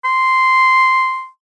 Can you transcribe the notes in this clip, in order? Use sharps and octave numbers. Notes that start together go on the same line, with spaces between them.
C6